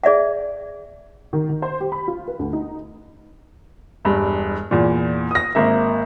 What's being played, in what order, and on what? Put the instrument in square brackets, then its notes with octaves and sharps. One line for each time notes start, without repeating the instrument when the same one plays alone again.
[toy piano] G#4 D5 E5 F#5
[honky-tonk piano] D#3
D#3
C5
G4
B5
F4
B4
D2
D#4
[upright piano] E1 G2
E2 A#2
D#6 A#6
G#1 A#3 E5